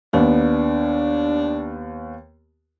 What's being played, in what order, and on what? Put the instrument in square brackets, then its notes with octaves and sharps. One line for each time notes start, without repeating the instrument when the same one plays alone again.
[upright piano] D#2 B3 [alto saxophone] D4